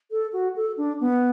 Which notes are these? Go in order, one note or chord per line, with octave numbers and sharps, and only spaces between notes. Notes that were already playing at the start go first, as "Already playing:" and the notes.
A4
F#4
A4
D4
B3